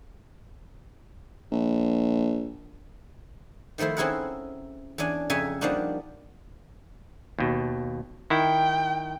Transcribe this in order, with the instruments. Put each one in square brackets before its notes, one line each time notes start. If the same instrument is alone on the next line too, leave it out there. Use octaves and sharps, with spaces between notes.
[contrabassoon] A#1
[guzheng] D#3 F3 A3 E4 C5
C4 C#4 E4 G#4 A#4 F#5
E2 C#4 D4 G#5
F2 C#3 C#4 E5 G#5 A#5
F3 G3 A#3 D4 D#4 F#4
[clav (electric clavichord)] D#2 B2
[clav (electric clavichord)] D#3 E4 [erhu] G5